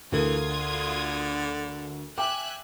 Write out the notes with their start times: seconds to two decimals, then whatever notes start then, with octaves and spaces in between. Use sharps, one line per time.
0.12 D2 E3 F4 A4 A#4 D#6 G#6
0.49 D3
2.18 E5 G5 G#5 D6 F#6